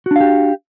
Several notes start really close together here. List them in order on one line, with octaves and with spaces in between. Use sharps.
F#4 D4 F5 G4